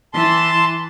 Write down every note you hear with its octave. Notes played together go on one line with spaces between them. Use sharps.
E3 A5 C6